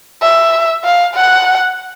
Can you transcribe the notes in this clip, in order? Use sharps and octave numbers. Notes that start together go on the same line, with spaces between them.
E5
F5
F#5